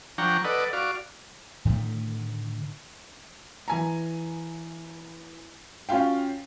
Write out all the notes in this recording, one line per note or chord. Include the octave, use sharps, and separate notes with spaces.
F3 D4 F#5 G5 A#5 C#6
A4 B4 D5 D#5 F#5
F#4 D5 F5
A2 D3 D#3 A3
E3 G#5 A#5
C#4 F4 F#4 F5 G5